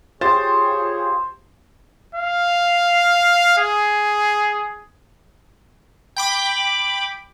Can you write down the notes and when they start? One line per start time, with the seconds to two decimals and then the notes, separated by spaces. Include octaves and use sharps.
0.21 F4 G4 G#4 C5 C#5 A6
2.15 F5
3.58 G#4
6.16 G5 B5 D6